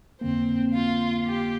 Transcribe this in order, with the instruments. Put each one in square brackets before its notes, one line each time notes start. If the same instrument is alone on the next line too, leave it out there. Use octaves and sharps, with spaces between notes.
[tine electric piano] F2 D3 A#3 [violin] C4
[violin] F4
G4